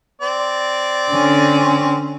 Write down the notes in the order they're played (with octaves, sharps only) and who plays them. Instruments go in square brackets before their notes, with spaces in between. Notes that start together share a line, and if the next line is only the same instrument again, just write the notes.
[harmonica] C4 D5
[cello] D3 C#4